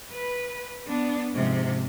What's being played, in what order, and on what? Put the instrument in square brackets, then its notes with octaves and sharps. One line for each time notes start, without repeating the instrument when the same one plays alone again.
[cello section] B4
B3 D4
G#2 C3 F3